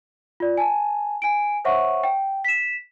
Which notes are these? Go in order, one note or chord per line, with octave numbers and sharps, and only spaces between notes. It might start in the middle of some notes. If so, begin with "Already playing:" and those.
F4 D5
G#5 A5
G#5 D7
C5 C#5 E5 F#5 C#6
G5
B6 E7